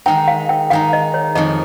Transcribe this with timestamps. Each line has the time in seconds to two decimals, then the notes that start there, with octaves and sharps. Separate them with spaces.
0.06 D#3 G#3 D#4 G5
0.28 F5
0.49 G5
0.70 D#3 G#3 D#4 F5
0.93 D#5
1.14 C#5
1.35 F2 D#3 G#3 D#5